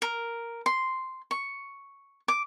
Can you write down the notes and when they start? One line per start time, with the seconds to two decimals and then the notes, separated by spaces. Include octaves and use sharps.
0.02 A#4
0.66 C6
1.31 C#6
2.28 D6